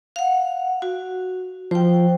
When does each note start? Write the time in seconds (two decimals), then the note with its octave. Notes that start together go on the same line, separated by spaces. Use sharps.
0.16 F5 F#5
0.82 F#4
1.71 F3 C5 G5